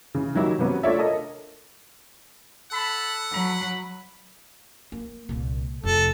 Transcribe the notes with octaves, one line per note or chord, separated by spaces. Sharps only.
C#3 E3
D#3 F#3 D#4 E4 G4
C3 F#3 B3 C#4
A3 D4 F4 C#5 D5 E5
A4 A#4 D#5
A4 F#5 A5 B5
F#3 B5
A#3
C2 A#2
F1 F4 A4